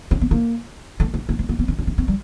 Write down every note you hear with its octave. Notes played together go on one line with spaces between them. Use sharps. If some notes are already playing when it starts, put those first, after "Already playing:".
C#4
B3
A#3
A3
A3
A3
A3
A#3
B3
C#4
D4
C#4
C4
G3